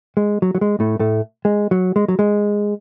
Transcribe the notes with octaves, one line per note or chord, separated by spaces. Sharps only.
G#3
F#3
F#3
G#3
A2 A3
A2 A3
G#3
F#3
G#3
F#3
G#3